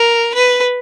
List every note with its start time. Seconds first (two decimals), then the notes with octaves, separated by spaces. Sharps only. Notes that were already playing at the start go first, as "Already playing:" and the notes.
Already playing: A#4
0.34 B4